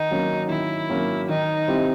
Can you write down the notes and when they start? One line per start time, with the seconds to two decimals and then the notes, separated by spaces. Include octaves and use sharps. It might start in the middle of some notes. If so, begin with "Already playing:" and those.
Already playing: D#3 D#4
0.11 F#3 A#3 C#4
0.50 D#3 E4
0.90 F#3 A#3 C#4
1.29 D#3 D#4
1.68 G3 C4 E4 G4